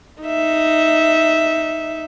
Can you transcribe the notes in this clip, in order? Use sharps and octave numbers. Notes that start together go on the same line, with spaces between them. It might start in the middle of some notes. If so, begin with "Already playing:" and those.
D#4 E5